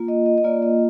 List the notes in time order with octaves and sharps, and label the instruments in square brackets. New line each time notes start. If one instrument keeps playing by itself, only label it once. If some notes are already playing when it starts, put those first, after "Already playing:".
Already playing: [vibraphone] A#3 F4
D#5
D#5
D#5
A#3 F4 D5
D#5